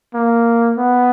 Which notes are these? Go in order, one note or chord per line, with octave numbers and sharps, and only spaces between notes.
A#3
B3